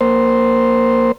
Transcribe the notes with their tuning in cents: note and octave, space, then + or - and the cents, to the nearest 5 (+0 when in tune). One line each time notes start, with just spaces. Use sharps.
A#3 +0 C5 +0